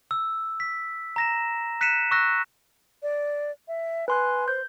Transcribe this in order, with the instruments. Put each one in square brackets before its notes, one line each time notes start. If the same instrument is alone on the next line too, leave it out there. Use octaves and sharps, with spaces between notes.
[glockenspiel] E6
B6
A#5 A#6 E7
F#6 B6 C#7 D#7 E7
C#6 E6 F#6 A#6
[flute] D5
E5
[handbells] B4 C6 F#6 [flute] G#5
[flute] C5 [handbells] G6